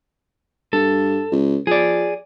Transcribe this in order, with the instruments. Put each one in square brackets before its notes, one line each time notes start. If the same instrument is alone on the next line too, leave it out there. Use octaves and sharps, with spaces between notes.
[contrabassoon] G2 [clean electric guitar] A4
[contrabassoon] C#2
[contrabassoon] F3 [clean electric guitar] G#4 D5